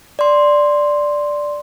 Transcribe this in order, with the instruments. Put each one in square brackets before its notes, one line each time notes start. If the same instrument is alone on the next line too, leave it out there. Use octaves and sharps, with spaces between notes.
[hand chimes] D5 C6